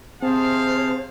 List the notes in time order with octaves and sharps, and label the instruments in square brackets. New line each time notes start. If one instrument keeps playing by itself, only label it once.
[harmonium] C3 G#4 A5 [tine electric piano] C4 [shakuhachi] C5 [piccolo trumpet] F5